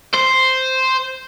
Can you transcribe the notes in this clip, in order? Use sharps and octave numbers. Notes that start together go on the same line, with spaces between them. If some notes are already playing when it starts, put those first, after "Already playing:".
C5